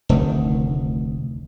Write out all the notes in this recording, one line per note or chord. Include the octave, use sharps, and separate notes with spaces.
F1 D2 D#3